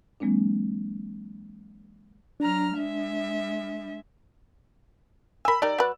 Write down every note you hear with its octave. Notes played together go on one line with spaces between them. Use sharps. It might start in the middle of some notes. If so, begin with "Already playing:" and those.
E3 F#3 G#3 A#3 C4 D4
F#3 D4 A#5 F6
G#3 E5
A#4 G#5 B5 E6
G3 D#4 A#4 D5
F#3 B4